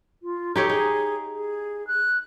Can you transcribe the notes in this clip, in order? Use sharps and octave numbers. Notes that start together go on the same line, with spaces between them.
F4
D#4 G4 A4 C#5
D#4 G#4
G#4
F#6